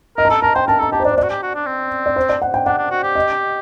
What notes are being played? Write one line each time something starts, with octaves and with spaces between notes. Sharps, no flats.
A#4 D#5
A#5
A4 A5
A#4 A5
C5 G5
A#4 A5
A4 A#5
G4 A5
C5
D4 D5
C5
D4 D5
F#4
G4
F#4
D4
C4
D5
C5
D5
F#5
G5
D4 F#5
D4
F#4
G4
D#5